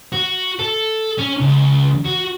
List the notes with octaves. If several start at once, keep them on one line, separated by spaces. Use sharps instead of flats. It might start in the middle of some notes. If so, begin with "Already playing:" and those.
F#4
A4
C#4
C#2
F#4